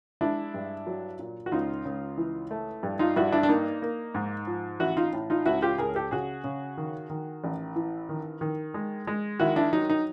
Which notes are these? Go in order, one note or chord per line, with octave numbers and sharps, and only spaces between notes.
G#3 D4 E4
G2
F#3
A#2
F#4
C#2 D#4 F4
C#2
E3
A3
G2
D#4 F4
G2 E4 F#4
D4 E4
D4
A#3 D#4
A#3
G#2
F3
A1 E4 F#4
D#4 F4
A2
D#4 F4
C#2 E4 F#4
F4 G4
C#2 G#4 A#4
G4 A4
C#3 F#4 G#4
C#3
D#3
D#3
A1
E3
D#3
D#3
G#3
G#3
D#3 E4 F#4
D4 E4
F#3 D#4
D#4